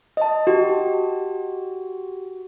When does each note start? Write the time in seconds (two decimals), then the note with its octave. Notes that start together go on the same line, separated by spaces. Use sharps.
0.17 D#5 A5
0.47 F#4 G4